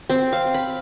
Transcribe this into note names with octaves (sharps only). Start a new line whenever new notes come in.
C4
F5
B5